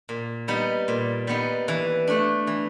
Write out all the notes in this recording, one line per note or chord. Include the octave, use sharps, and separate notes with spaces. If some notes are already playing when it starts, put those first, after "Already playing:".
A#2
G3 B3 D#4
A#2
G3 B3 D#4
E3
A3 D4
E3